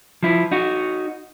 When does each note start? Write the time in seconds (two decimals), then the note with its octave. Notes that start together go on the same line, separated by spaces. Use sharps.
0.23 F3 E4
0.51 D#4 F#4